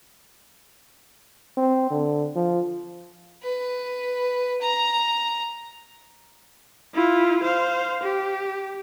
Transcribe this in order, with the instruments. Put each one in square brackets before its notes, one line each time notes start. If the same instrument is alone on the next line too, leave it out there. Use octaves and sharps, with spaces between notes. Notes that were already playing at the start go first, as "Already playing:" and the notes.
[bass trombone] C4
D3
F3
[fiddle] B4
A#5
[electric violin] E4 F4
C5 F5
G4